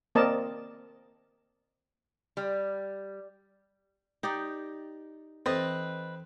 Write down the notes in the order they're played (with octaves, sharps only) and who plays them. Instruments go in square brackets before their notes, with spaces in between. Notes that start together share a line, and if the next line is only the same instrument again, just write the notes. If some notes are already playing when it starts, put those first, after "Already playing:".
[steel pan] A#3 C4 A#4 D5 D#5 A5
[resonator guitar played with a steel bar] G3
[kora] D#4 G4 D5 [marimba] G5 A#5
[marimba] E3 A4 [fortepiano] C4 [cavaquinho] B4 D#5